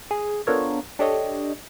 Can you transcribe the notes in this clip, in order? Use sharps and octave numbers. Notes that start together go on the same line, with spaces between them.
G#4
B3 D4 F4 A4 A#4 C#5
D4 G4 A4 C#5 D#5